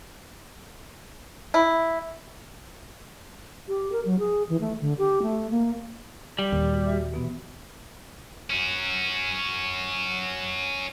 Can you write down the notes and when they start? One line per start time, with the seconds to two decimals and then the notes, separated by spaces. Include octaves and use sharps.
1.54 E4
3.68 G4
3.92 A#4
4.06 F#3
4.19 G#4
4.49 E3
4.61 A3
4.81 D3
4.98 G4
5.22 A3
5.51 A#3
6.39 G3
6.52 D#2 A#2
6.70 F#4 G4
6.86 F#4 E5
7.14 B2 E3 B3
8.50 C#4 F#4